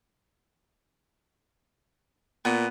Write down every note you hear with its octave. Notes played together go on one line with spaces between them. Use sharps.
A#2 B3